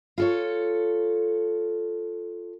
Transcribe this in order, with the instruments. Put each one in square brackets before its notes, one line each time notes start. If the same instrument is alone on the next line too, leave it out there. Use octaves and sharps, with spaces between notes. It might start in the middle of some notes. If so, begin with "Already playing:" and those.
[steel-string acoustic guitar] F4 A4 C#5